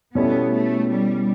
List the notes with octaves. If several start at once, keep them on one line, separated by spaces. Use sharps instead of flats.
B2 G3 B3 C#4 E4 A4
A3
G3